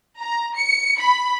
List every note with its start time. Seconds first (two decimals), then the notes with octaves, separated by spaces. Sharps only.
0.20 A#5
0.57 C#7
0.99 B5